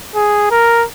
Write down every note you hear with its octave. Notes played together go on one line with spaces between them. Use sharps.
G#4
A#4